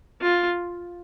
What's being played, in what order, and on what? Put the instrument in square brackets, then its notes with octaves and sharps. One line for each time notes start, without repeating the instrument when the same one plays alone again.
[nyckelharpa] F4